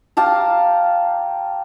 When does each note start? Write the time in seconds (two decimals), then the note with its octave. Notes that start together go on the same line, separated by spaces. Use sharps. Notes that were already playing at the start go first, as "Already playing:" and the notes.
0.17 G4 F5 A5 A#5